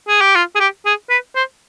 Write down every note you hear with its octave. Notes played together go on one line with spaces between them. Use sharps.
G#4
G4
F4
G#4
G4
G#4
B4
C5